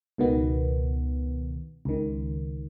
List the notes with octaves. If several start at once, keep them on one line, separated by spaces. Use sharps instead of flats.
C#2 B2 D#3 B3
C#2 D#3